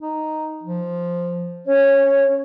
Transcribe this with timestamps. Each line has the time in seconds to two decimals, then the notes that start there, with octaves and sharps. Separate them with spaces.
0.01 D#4
0.63 F3
1.67 C#4 C#5